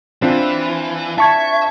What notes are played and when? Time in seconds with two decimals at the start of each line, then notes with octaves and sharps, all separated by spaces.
0.22 E3 C4 D4 F4
1.18 E5 A5 C#6 G#6